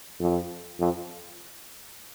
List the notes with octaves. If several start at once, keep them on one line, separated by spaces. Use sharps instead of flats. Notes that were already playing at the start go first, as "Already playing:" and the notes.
F2
F2